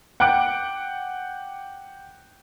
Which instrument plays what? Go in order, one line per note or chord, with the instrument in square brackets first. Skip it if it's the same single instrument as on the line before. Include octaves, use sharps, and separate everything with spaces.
[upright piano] F#5 G5 D6 F#6 D7